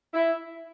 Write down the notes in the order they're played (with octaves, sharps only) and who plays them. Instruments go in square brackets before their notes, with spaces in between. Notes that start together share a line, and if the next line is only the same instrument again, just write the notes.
[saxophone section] E4